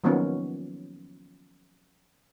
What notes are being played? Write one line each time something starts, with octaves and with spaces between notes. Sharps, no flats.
D#3 F3 F#3 A#3 B3 C#4